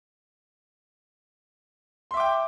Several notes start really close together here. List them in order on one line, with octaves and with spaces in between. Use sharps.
C6 E5 D6 G5